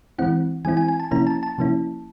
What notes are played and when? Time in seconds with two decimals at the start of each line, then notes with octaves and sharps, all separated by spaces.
0.19 E3 G#3 C4 E4 F#5
0.65 E3 G#3 C4 E4 G#5
0.77 G#5
0.88 G#5
1.00 A5
1.11 C3 F3 A#3 C#4 E4 A#5
1.27 A5
1.43 A5
1.58 C3 F3 A#3 C#4 E4